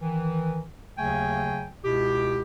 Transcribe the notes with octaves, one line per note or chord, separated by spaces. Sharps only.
D#3 E3
D#2 C#3 F#3 A3 G5 G#5
C#2 B2 E4 G4